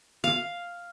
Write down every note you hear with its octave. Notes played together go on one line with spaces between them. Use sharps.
F5